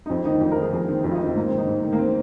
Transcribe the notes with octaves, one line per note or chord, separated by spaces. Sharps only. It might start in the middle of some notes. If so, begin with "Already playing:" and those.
D#4
F2 C4
D#3 D#4
F2
C5
A#4
D#3 G#4
F2 G#4
D#3 C4
F2 C4
F4
D#4
D#3
C4
G#2 A#3
C4
D#3
D#4
G#2
D#3
A#3
C4